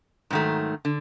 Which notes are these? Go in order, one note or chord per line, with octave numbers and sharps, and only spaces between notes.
G#2 D#3 F#3 A3
D3